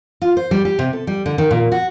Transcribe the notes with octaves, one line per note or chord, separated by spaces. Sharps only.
F4
C5
G3
G4
C3
A4
G3
D3
D#3
A#2
F#4